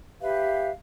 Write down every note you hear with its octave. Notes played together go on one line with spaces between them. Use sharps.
G4 B4 E5 F5